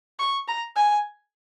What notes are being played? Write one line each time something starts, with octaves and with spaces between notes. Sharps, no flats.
C#6
A#5
G#5